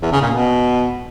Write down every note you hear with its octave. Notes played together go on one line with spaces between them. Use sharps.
E2
C#3
A#2
B2